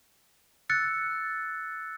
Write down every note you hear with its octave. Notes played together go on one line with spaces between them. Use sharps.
E6 F#6 A6 C#7